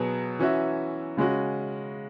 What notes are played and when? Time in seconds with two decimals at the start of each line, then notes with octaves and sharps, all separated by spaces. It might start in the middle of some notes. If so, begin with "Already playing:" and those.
Already playing: B2 F#3 B3 G#4
0.39 E3 C#4 F#4 E5
1.17 C#3 G#3 C#4 F#4